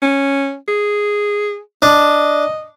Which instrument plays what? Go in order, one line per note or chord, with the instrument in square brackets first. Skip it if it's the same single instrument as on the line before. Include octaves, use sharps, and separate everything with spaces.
[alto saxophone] C#4
G#4
[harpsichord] D4 [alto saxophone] D#5